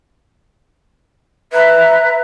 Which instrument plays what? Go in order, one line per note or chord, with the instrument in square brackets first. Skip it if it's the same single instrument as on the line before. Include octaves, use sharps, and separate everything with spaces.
[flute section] B4 A#5 F#6 [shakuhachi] E5